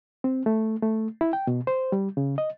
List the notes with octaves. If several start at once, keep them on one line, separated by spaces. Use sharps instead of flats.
C4
A3
A3
E4
G5
B2
C5
G3
C#3
D#5